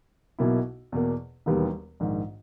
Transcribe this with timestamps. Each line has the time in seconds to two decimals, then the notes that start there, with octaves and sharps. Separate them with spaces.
0.39 B1 B2 A#3 E4
0.92 E2 B2 A#3
1.46 E1 D#2 D#3 G3 B3
2.00 A#1 G#2 D#3